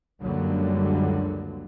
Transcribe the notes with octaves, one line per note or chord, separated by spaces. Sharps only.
C#2 F#2 D3 F#3 G3 A#3